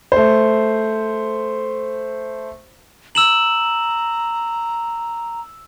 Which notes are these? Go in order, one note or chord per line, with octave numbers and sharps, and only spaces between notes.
A3 C5
A#5 E6 E7 F#7